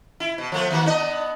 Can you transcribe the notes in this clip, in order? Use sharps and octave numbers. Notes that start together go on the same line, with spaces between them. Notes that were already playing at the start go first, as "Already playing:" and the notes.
E4
B2
F3 A3 B3
D#3 A#3 F#4
B3 D4 D#5